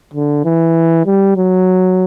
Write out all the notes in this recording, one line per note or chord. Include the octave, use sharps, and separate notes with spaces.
D3
E3
G3
F#3